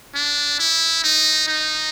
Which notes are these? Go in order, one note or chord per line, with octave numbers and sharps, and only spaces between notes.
D4
E4
D#4
D#4